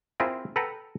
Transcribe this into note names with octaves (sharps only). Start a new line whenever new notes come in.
C4 E4 F4 G#4 A#4
A4 B4 F#5 G5 A#5